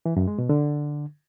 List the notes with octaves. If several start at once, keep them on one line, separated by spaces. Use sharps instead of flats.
E3
F#2
G#3
B2
D3